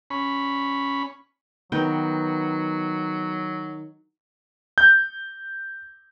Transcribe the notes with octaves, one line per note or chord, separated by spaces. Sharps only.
C#4 B5
D#3 F#3 B3 G5
G6